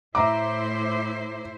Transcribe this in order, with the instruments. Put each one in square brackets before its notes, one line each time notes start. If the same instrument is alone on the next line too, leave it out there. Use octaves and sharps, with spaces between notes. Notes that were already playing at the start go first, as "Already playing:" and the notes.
[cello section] A2 E4 C5 [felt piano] E5 A#5 D6